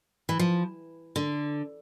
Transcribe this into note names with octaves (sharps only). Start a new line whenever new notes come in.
E3
F3
D3